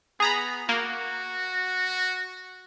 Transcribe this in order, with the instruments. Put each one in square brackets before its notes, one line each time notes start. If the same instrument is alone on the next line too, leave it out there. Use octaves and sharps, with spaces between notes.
[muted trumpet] B3 [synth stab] G#4 A#5 B5
[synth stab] A#3 [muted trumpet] F#4